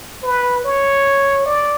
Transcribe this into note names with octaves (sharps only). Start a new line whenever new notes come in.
B4
C#5
D5